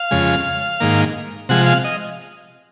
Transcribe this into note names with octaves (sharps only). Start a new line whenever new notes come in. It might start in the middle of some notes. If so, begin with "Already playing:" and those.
Already playing: F5
F2 C#3 G#3
G#2 D#3 A#3
C3 F3 G#3 F#5
F5
D#5